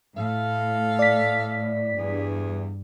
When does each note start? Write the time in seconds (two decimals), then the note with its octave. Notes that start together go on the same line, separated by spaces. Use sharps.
0.16 A2 A4 F5
0.99 D5 B6
1.98 E2 G2 G#4